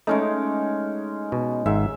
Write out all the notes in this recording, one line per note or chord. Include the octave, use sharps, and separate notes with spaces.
G#3 A3 C#4 D#4
B2
G#1 G#2 E5